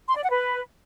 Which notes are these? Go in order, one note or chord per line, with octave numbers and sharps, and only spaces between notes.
C6
D5
F#5
B4